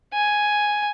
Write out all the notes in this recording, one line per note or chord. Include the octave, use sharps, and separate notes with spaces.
G#5